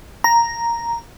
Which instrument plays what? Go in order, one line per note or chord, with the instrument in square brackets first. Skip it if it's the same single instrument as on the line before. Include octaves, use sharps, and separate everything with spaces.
[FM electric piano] A#5